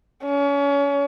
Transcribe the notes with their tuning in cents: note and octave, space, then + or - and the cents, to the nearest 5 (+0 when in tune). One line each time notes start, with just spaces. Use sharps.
C#4 +30